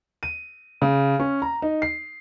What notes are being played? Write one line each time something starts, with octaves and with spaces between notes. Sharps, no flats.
D#7
C#3
C#4
A#5
D#4
C7